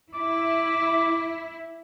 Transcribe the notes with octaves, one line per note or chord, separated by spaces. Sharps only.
E4 D6